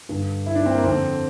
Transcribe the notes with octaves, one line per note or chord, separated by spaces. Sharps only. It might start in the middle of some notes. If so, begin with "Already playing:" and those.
G2 D3
E4
D4
C4
A#3
F2 D3 C4